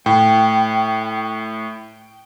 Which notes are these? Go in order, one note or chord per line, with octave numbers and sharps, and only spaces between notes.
A2 G5